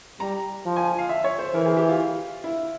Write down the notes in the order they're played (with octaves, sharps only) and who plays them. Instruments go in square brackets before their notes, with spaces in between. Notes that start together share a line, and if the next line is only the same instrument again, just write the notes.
[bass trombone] G3 [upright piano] A#5
[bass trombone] F3
[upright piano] G#5
F5
E5
C#5
C5
[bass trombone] E3 [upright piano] A#4
[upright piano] G#4
G4
F4
E4